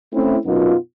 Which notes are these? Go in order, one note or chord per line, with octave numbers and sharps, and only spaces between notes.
A3 C4 C#4 E4
F#2 B2 B3 D#4 F4